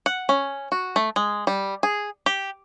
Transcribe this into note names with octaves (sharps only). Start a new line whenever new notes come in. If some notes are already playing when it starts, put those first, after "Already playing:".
F#5
C#4
F#4
A3
G#3
G3
G#4
G4